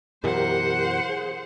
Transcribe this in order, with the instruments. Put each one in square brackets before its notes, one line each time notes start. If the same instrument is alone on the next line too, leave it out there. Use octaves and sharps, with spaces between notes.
[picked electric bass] F#2 B2 E3 [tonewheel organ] G4 A#4 [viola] C5 F#5
[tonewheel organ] G#4